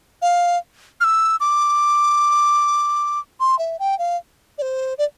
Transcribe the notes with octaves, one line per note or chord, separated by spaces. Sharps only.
F5
F6
E6
D6
C6
E5
G5
F5
D5
C5
D5